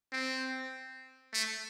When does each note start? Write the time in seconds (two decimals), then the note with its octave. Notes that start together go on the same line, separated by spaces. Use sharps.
0.12 C4
1.34 A3